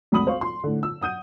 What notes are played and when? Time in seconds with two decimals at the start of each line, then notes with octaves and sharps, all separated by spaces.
0.12 G#1 D2 B5 D#6 F#7
0.27 C5 F5 C#6
0.41 C6
0.64 A2 D3
0.83 E6
1.01 F#5 D#6 G6 D#7